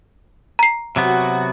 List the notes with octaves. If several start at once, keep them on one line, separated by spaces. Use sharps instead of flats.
A#5 C7
C3 F#3 B3 F#4